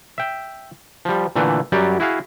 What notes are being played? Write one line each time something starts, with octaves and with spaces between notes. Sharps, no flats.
E5 G5
F3 G3
A#2 D3 E3 A3
F#2 F#3 G3 G4 D5
E4 F#4 G#4 F5